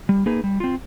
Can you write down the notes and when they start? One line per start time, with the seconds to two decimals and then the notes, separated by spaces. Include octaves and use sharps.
0.09 G3
0.26 A#3 D#4 G#4 B4
0.44 G3
0.60 C4 F4